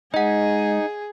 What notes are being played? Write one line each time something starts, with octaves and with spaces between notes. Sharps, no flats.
G#3 D#4 G#4 D#5 F#5